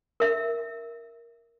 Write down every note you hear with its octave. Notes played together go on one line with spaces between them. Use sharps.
A#4 E5